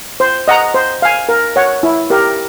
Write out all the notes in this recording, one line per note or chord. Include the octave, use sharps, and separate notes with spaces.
C5
D#5 F#5 A#5
C5
F5 G#5
A#4
C#5 F#5
E4
G4 A#4